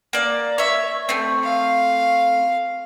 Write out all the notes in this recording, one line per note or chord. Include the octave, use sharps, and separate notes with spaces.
A#3 D5
C#5 E5
A3 C4
F5